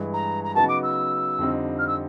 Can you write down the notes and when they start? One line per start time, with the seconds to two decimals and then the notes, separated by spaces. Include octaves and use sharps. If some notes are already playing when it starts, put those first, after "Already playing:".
Already playing: G2 E3 G#3
0.13 A#5
0.44 A#5
0.55 C#3 F#3 B3 D#4 F#4 A5
0.69 D6
0.83 E6
1.38 F2 D3 G3 C4 D#4
1.79 F6
1.87 E6